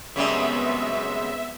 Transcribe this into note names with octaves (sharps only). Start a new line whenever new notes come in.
F#2 C#3 G3 G#3 B3 C4 E5